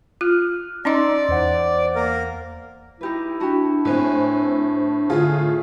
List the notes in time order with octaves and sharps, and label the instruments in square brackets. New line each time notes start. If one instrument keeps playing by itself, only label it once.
[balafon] F4 [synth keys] F6 F#6
[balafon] C#4 D#4 D#5 [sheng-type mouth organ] D5 [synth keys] A#5 C6 E6
[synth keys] E2 C5 F#5
[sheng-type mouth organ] A#3 A#4
[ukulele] D#4 G4 B4 [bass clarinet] E4
[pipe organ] D4 [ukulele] F#4 G4
[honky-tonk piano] A2 C4 [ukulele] B4 C#5 G#5
[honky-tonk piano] A2 F4 G#4 [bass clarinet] D3